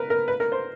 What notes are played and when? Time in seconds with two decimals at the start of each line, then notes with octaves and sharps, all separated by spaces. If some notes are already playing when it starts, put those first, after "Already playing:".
Already playing: A#4 B4
0.10 A#4
0.28 B4
0.40 A#4
0.52 C5